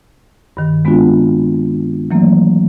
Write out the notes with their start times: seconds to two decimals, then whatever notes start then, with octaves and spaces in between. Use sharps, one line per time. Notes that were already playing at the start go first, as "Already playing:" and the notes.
0.57 G2 D#3
0.85 G#3 B3 C4 D4 F4 F#4
2.11 E3 F#3 A3 A#3 C4